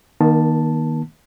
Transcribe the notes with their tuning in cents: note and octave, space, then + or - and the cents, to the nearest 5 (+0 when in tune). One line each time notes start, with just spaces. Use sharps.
D#3 +0 A#3 +40 A5 +0